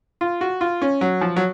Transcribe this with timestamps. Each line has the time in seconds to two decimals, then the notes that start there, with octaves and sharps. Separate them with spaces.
0.21 F4
0.41 F#4
0.61 F4
0.82 C#4
1.01 F#3
1.21 F3
1.36 F#3